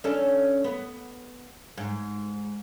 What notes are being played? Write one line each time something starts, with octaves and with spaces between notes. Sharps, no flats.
C#4 D4 A4
B3
G#2